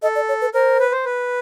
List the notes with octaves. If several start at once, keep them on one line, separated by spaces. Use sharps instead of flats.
A4 D#5
D5
C#5
B4
A#4 C5
B4
C5
B4